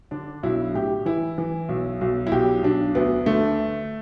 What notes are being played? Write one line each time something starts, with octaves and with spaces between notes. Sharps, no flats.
D3 D4
B1 E4
A2 G4
E3 E4
E3
B1
B1
E4
B1 G4
B1 D4
D2 B3
D3 A3